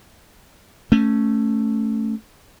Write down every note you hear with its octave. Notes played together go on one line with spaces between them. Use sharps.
A3 C#4